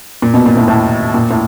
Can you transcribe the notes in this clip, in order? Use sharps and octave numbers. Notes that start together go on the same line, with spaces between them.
A#2
B2
A#2
A2
A2
A#2
A2